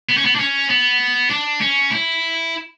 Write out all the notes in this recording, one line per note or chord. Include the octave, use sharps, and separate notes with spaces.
B3
C#4
B3
D4
C#4
B3
D4
C#4
E4